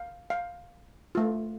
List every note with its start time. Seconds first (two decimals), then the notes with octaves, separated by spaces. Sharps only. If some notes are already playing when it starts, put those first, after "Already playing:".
Already playing: F5
0.30 F5
1.15 A3 F4